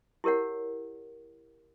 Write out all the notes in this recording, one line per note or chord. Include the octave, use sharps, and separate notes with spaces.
E4 G4 A#4 C#5 F#5